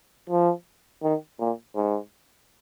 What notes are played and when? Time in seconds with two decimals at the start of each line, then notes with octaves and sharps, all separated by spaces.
0.29 F3
1.03 D#3
1.40 A#2
1.76 G#2